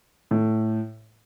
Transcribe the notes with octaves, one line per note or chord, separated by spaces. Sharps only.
A2